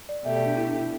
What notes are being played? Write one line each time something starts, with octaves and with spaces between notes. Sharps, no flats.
D5
B2 A3 G4 E5
D5
D4
E4
D4
E4